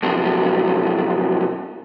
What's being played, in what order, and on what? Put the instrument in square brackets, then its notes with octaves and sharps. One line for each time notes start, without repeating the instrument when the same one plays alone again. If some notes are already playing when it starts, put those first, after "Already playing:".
[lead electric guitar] B1 F2